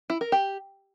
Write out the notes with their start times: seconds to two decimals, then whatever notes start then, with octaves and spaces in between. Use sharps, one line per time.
0.10 E4
0.21 A#4
0.32 G4